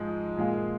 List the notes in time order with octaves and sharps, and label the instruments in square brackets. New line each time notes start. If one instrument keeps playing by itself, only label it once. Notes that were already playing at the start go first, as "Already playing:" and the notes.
Already playing: [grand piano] G#2 F3 G#3 D#4
A#2 G#3 F4 G#4